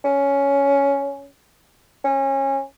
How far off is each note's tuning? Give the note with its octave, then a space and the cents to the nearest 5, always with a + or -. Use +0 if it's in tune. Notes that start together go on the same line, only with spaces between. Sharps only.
C#4 +10
C#4 -25